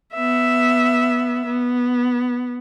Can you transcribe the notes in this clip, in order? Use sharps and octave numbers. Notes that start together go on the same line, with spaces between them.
B3 E5
B3